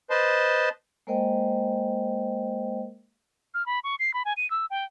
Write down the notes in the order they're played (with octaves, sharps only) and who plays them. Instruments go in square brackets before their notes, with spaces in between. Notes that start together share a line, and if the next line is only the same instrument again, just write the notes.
[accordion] B4 C5 D#5 A5 C6
[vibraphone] G#3 A#3 A#4 C5 D#5 G5
[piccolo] F6
B5
C#6
C7
B5
G#5
D#7
E6
G5